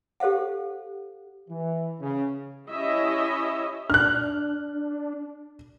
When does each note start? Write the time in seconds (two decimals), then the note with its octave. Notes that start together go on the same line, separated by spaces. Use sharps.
0.20 G4 A4 C5 F5 F#5
1.49 E3
2.00 C#3
2.70 C#4 E4 G4 C#5 D#5 E5
3.90 D4 F6 F#6